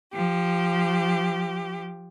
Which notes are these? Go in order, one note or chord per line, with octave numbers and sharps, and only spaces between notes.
F3 G4